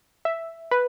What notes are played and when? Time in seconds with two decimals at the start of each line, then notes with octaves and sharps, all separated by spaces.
0.25 E5
0.71 B4